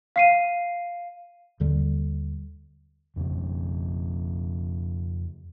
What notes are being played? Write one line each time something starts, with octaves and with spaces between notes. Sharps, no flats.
F5 C7 D#7
D#2 D3 G3
F2 C#3 F3